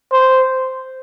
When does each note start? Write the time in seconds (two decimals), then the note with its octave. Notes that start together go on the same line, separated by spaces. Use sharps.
0.13 C5